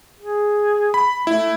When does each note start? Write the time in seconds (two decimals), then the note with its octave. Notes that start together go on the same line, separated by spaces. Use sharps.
0.20 G#4
0.94 B5
1.27 A3 E4